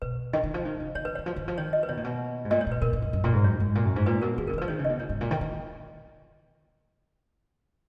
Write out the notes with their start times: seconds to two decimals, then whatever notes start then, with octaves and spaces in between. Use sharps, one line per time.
0.02 B2 B4
0.33 D#3 D#5
0.43 D#3
0.54 F3
0.65 D#3
0.80 C#3
0.95 D#3 C#5
1.05 B4
1.15 D#3 C#5
1.26 F3
1.36 D#3
1.48 F3
1.58 D#3 C#5
1.73 D#5
1.83 B4
1.89 B2 C#5
1.97 A#2
2.04 B2
2.45 G#2
2.50 A#2 D#5
2.61 C#5
2.67 A#2 B4
2.82 A#2 A#4
2.93 A#2
3.02 F#2
3.13 F#2
3.24 A#2
3.33 G#2
3.44 F#2 C#5
3.60 G#2
3.75 A#2
3.85 F#2
3.96 G#2
4.06 A#2 B4
4.22 B2 A#4
4.38 D#3 G#4
4.47 C#3 A#4
4.53 D#3
4.58 F3 B4
4.68 D#3 C#5
4.79 C#3
4.85 B2 D#5
4.99 A#2 C#5
5.09 G#2
5.21 A#2
5.31 D#3
5.41 D#3